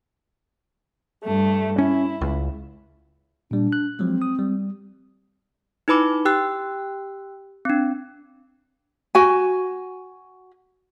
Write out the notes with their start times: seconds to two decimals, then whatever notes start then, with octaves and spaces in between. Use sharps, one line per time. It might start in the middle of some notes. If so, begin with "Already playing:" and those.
1.24 G2 A3
1.78 C#4 E4
2.21 C#2
3.51 A#2 G3 D4
3.73 F#6
3.99 F3 F#3 G#3 C4
4.22 D#6
4.39 G3
5.88 D#4 E4 B4 B5 D6
6.25 G4 G5 E6 F#6
7.65 C4 D4
9.15 F#4 G#5